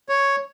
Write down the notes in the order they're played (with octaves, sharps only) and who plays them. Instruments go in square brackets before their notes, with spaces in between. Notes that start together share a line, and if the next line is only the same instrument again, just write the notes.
[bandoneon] C#5